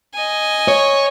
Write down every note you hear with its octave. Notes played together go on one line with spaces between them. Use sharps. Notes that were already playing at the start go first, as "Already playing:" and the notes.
D#5 G#5
C#5